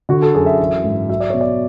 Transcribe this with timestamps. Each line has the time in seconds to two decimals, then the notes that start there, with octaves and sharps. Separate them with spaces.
0.09 D3 F#4
0.22 A4
0.34 F#2 G#4
0.46 E5
0.59 E3
0.84 G#2
1.09 F#3 E5
1.20 D5
1.30 B2 C#5
1.41 D5